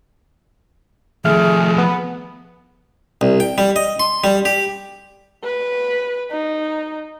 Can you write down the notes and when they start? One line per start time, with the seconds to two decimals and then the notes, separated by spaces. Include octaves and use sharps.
1.25 D#3 F3 A3 G#4 E5 F6
1.78 B3
3.21 C2
3.40 G5
3.58 G3
3.76 D#5
4.00 C6
4.24 G3
4.45 G4
5.43 B4
6.31 D#4